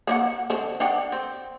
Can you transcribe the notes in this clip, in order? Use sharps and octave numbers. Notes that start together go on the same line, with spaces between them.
A#3 C5 F#5
D3 C5
D4 F#5 G5
C4